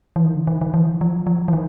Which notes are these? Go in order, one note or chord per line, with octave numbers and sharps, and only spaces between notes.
E3
D#3
D3
D#3
D#3
E3
F3
F3
E3
D#3